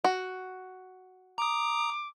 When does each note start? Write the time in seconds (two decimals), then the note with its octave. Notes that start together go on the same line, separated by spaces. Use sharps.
0.04 F#4
1.38 A#5 D6 D#6